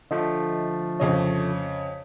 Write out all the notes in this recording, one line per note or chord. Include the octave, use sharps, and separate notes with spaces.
D3 F3 A3 D#5
F2 C#3 C#5 D#5